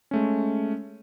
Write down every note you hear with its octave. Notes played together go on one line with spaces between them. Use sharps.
G#3 A3 C#4